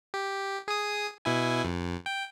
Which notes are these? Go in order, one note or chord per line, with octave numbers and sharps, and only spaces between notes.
G4
G#4 D#6
B2 E4 G#5
F2
G5